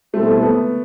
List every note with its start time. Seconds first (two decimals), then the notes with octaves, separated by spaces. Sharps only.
0.14 B2 G3 A3 C4 E4 A4
0.42 B3